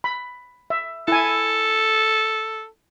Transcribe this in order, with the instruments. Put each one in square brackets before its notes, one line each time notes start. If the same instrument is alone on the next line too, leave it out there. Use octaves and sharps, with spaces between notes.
[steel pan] B5
E5
[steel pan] E4 G#5 [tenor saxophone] A4